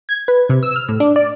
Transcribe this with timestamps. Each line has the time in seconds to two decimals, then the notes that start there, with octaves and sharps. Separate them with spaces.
0.09 G#6
0.28 B4
0.49 C3
0.63 E6
0.76 F6
0.88 A2
1.00 D4
1.16 D5